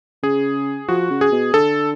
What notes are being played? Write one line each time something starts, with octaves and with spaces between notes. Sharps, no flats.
C#3 G#4
F3 F#4
C#3
G#4
B2
D3 A4